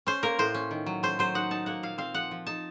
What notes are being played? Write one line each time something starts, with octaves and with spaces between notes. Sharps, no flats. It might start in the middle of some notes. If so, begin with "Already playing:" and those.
C#4 C5
A#3 A#4
A2 C5
C#4
D#3
F#3
C#4 C5
F#3 C5
D#4 F#5
D#4 A5
A#3 F#5
A#2 F5
C4 F5
F3 F#5
F3
D#4 A5